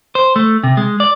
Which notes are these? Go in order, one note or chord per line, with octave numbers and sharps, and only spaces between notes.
C5
A3
C3
G#3
D5